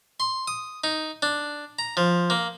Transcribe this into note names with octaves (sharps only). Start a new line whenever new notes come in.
C6
D#6
D#4
D4
A#5
F3
A#3